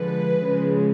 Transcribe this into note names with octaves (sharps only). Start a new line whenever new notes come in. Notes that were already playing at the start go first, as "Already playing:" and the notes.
Already playing: D3 F3 G#3 B4
C#3 F3 G#3